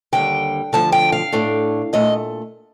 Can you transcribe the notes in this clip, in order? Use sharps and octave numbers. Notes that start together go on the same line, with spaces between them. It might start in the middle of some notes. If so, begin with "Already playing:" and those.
D#2 D3 G3 G5
D2 D3 F3 A5
G5
F5
A2 A3 D4
A#2 A3 D#5